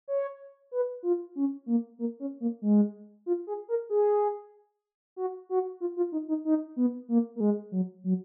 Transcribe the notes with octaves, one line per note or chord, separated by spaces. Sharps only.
C#5
B4
F4
C#4
A#3
A#3
C#4
A#3
G#3
F4
G#4
A#4
G#4
F#4
F#4
F4
F4
D#4
D#4
D#4
B3
A#3
A#3
G#3
F#3
F#3